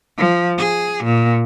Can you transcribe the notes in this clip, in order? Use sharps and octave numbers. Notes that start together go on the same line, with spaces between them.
F3
G#4
A#2